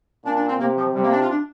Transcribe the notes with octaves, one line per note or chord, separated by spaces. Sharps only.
A#2 D4
D4
C4
C3 A#3
F3
C3 G3
A#3
D4
F4
D4